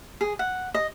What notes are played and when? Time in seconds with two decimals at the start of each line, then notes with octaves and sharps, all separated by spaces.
0.21 G#4
0.39 F#5
0.74 D#5